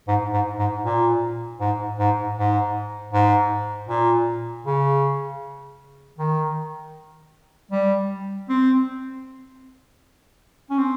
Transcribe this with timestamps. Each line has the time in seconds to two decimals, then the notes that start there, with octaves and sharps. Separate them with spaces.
0.08 G#2
0.33 G#2
0.59 G#2
0.84 A#2
1.60 G#2
1.99 G#2
2.37 G#2
3.13 G#2
3.89 A#2
4.66 C#3
6.19 D#3
7.71 G3
8.49 C4
10.70 C#4
10.78 C4